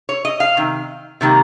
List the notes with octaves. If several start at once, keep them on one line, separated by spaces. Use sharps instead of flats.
C#5
D#5
F5
C3 D#3
C3 D#3 G3 A#3